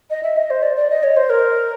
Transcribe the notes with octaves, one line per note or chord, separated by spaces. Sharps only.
D#5
E5
D#5
C5
D5
D5
D#5
C#5
C5
A#4